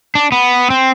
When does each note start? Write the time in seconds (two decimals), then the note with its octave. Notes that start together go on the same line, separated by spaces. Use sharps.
0.15 D4
0.32 B3
0.70 C4